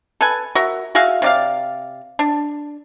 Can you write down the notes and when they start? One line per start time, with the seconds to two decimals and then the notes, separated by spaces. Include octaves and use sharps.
0.21 A4 B4 G#5
0.55 F#4 A#4 E5
0.95 F#4 G#4 E5 F5
1.22 C3 D5 F5
2.19 D4